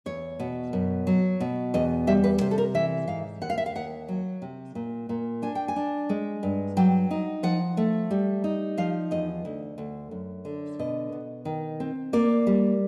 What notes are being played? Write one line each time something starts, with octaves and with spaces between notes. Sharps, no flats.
E2 C#5
B2
F#2
F#3
B2
E2 D#5
G3 E5
B4
C3 C5
A4
A#4
E3 E5
G#2 F5
D#2 F#5
F5
E5
F5
D#2 F#5
F#3
C3
A#2
A#2
D4 G#5
G5
G#5
D4
G#3
G2
F#3 G5
D#4
F3 F#5
A3
G3
D#4
F3 F5
E2 D#5
D2
D2
F#2
D3
B2 D#5
B2
D#3
C4
A#3 D5
G3